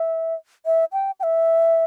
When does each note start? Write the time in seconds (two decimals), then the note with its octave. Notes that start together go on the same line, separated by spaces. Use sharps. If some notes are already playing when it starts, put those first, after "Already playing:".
Already playing: E5
0.66 E5
0.92 G5
1.20 G5
1.23 E5